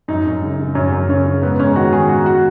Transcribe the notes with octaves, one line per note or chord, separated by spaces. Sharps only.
F#2 D#4
F#2
C#3
C#3
F#2 C#4
F#2
C#3 C#4
C#3
G#2 B3
G#2 C#4
D#3 F#4
D#3 G#4
G#2 F#4
F#4